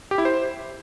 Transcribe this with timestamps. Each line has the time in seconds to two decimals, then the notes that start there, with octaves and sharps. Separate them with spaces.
0.11 G4
0.18 E4
0.25 C5